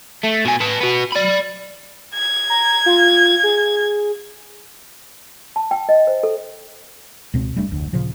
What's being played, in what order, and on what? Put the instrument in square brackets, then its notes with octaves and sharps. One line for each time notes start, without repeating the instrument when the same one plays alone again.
[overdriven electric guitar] A3
B2 G#5
B4 A5
B3 F#4
D5 B5
[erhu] G#6
[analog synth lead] A#5
F4
G#4
[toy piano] A5
G5
D#5
C5
A4
[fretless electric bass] C#2 B2 C4
F1 G3 A3 D4
F1 D2
A#2 C#3 F3